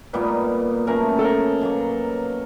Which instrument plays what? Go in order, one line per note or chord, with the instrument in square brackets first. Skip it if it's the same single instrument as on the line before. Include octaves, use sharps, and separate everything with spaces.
[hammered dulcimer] A#2 G3 B3 D#4 [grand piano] B4
[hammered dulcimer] C#3 F#3 A3 C#4 [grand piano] A#4
[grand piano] A4
A#4
[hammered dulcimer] B2 F#3 A#3